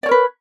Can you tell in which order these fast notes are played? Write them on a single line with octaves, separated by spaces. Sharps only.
D5 C#5 A#4 B4